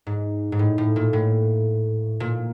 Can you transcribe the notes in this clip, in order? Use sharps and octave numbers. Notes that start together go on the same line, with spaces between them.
G#2
G#2
A2
A2
A#2
A2
A#2